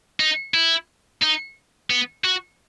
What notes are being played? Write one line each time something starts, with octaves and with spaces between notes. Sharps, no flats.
D#4
E4
D#4
B3
F#4